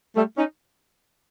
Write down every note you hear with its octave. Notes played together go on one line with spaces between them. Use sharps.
G3 A3
C#4 D#4